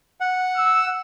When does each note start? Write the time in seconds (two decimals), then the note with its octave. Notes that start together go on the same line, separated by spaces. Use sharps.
0.21 F#5
0.56 E6